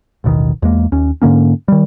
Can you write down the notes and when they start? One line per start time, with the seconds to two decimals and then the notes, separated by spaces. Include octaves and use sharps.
0.24 A1 D#2 B2 D#3
0.62 E2 G#3 A#3
0.92 D#2 C#4
1.22 G#2 D3 A#3 C#4
1.68 D#3 G3